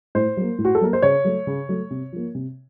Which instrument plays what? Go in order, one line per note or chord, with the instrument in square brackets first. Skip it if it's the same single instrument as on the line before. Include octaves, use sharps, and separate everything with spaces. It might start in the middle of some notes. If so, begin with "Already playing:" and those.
[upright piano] A2 C5
F#3 A#3
A2
F#4
A4
F#3 A#3 A#4
C5
C#3 C#5
F#3 A3
C#3
F#3 A3
C3
F3 A#3
C3